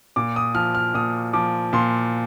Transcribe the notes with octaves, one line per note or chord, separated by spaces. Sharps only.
A#2 D6
D#6
F3 F6
F6
A#2 D#6
F3 D6
A#2 C6